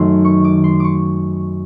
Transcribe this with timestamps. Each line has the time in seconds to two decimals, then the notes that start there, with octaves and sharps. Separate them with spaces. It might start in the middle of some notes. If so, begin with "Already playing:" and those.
Already playing: F#2 D#3 F#3 A3 C6
0.25 C#6
0.44 D6
0.64 C6
0.80 C#6 D6